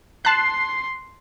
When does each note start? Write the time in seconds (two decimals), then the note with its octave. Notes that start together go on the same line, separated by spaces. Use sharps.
0.25 A5 C6 F#6 C7